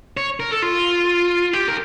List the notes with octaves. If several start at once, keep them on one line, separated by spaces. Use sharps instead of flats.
C#5
A#4
A4
F4
G4
A#4